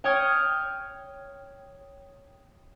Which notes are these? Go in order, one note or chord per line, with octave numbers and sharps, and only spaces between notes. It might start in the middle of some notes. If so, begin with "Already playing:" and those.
C#5 G5 D#6 F6 G#6